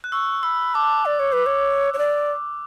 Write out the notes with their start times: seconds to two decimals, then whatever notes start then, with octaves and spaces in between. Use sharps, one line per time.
0.04 F#6
0.12 C#6 E6
0.43 B5 E6
0.75 A5 D6
1.06 D5
1.19 C#5
1.33 B4
1.46 C#5
1.94 C#5
1.98 D5